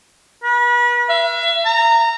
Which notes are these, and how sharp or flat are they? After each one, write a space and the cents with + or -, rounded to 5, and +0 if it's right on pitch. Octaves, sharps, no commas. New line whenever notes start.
B4 -35
E5 +35
A#5 -20